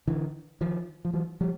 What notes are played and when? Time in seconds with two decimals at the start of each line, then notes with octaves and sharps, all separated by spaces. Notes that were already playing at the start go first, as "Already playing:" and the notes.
0.07 D3 E3
0.61 D#3 F3
1.05 F3
1.13 E3 F#3
1.41 F3 G3